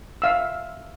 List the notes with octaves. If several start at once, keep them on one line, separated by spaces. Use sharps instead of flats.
E5 F5 E6